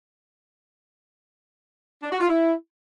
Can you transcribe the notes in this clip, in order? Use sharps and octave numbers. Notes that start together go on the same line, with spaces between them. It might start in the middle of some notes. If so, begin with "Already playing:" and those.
D4
F#4
F4
E4